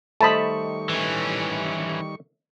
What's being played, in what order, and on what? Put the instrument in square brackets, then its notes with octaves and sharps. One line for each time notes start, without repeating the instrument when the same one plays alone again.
[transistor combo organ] D#3 G3 C#6 [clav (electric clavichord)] A3 C5 D#5 [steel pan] A5 B5
[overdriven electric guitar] E3 C#4